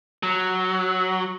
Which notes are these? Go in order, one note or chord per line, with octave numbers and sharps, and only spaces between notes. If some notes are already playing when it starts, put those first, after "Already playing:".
F#3